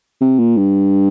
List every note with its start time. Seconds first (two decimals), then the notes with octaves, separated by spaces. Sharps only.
0.21 C3
0.39 A#2
0.57 G2